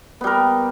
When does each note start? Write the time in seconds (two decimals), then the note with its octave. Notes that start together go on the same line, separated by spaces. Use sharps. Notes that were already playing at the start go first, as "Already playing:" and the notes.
0.21 B3
0.24 G3
0.27 A#4